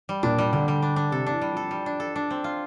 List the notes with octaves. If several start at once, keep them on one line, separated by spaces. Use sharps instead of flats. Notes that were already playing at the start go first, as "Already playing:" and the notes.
G3
A#2 D4
G3
D3 G3
G3
D4
D4
C3 A4
E3 D4
G3
F3 A4
G3
D4
A4
D4
C4
F4